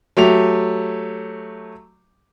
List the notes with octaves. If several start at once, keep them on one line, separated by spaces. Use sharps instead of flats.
F#3 A3 G4 F7